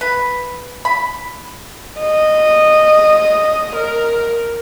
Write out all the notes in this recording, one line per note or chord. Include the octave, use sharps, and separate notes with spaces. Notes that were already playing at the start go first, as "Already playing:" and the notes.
B4
B5
D#5
A#4